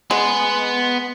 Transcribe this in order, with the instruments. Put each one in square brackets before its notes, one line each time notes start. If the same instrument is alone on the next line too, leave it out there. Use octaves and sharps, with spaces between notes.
[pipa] G#3 [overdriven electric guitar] B3